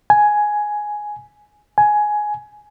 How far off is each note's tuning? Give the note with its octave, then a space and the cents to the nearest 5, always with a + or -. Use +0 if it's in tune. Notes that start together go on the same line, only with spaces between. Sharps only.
G#5 +5
G#5 +10